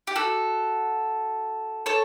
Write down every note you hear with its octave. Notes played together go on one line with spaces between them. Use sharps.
G4
F#4 A4
A4 C#5